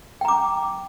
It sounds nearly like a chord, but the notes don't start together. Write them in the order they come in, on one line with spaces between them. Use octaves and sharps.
G5 A#5 D6